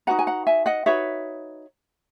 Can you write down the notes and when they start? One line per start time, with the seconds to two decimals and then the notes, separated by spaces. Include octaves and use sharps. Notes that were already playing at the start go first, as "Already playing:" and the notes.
0.07 D#4 F#4 B4 F#5 A#5
0.19 G#5
0.27 F#5 A#5
0.47 E5 G#5
0.66 D#5 F#5
0.86 D#4 F#4 B4 C#5 E5